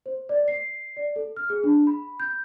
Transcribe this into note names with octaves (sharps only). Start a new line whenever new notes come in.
C5
D5
C7
D5
A4
F6
G#4
D4
B5
G6